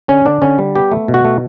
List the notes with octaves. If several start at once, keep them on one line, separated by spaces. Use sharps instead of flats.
D3 C#4
D3 D4
D3 C#4
G3
B3 G4
A3
B2
F#4
A3